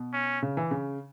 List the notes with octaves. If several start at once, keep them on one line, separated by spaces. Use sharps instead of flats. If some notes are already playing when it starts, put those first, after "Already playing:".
Already playing: B2
C#4
C#3
E3
C#3